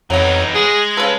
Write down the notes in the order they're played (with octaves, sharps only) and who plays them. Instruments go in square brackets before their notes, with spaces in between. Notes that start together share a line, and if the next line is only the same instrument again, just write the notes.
[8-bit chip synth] F2 C#5 F#5 [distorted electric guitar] E3 D#4 [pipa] F#3 B3
[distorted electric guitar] G#3 [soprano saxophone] G#4 [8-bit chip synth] G#6 A#6
[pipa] C#3 A4 [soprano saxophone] B4